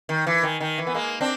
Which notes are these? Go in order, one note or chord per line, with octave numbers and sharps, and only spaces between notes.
D#3
E3
D#3
D#3
E3
B3
G#3 A#3
C4 D4